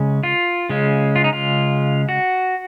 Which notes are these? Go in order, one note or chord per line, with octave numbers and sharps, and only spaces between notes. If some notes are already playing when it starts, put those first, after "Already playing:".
Already playing: C#3 G#3 C#4
F4
C#3 G#3 C#4
F4
D#4
F4
F#4